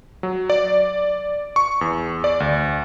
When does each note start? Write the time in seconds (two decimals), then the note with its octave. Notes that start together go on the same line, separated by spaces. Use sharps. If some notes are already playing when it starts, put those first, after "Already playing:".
0.23 F#3
0.50 D5
1.56 C#6
1.81 E2
2.24 D5
2.40 D2